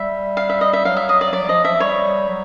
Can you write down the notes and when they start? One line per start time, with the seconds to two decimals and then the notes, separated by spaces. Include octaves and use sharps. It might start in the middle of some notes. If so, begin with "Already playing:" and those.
Already playing: G3 E5
0.37 F5
0.49 E5
0.61 D#5
0.73 E5
0.85 F#3 F5
0.97 E5
1.09 D#5
1.21 D5
1.33 F#3 D5
1.43 F#3
1.48 F3 D#5
1.64 F3 E5
1.80 G3 C#5
2.28 F#3